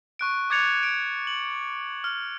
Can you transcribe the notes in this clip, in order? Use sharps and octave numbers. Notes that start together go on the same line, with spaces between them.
C#6 F#6 D7
D6 F#6 G#6 A6 C#7 F7
D7
F#7
F6